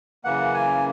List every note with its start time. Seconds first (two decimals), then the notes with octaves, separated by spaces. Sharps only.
0.24 F#2 C#3 E3 A#3 F#5
0.54 G#5